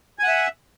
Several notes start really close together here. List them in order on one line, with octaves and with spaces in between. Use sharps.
G#5 F#5 E5